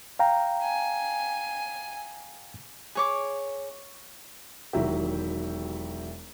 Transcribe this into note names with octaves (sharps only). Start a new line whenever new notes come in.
F5 G5 A#5
G#5
G#4 C#5 D6
E1 D#3 F#3 E4 G4